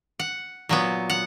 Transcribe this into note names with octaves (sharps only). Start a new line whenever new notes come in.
F#5
A#2 F#3 B3
F#5